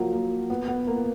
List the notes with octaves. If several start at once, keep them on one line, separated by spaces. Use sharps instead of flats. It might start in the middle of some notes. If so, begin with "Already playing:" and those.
Already playing: F3 F#3 A#3
A#3
B3
B3
A#3